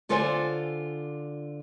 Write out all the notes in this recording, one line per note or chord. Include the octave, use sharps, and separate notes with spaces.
D3 F4 A4 C5 D5 G#5